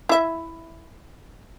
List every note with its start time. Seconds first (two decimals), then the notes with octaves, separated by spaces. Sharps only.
0.09 E4 E5